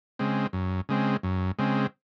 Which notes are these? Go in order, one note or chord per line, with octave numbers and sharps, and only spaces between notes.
C#3 G#3 C4
F#2
C#3 G#3 C4
F#2
C#3 G#3 C4